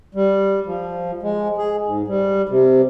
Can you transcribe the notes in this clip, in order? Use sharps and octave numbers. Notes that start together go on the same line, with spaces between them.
G3
F3
G#3
G#4
G#2
G3
C3